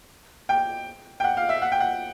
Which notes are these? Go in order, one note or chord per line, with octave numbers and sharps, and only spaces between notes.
G5
G5
F#5
F5
E5
F#5
G5
F#5